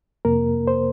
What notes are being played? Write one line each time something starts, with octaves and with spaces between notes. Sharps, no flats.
F2 C3 A#3 A#4
C5